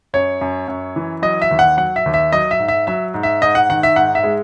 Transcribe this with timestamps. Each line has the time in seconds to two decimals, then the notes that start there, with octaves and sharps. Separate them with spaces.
0.13 F#2 C#5
0.41 F#2
0.68 F#2
0.96 E3
1.22 F#3 D#5
1.42 E5
1.51 D#2
1.59 F#5
1.77 F#3 F#5
1.96 E5
2.06 D#2
2.14 E5
2.32 F#3 D#5
2.51 E5
2.60 G#2
2.68 E5
2.87 F#3 E5
3.14 G#2
3.23 E5
3.42 G#2 D#5
3.55 F#5
3.69 D#3 F#5
3.83 E5
3.96 G#2 F#5
4.15 E5
4.24 G#3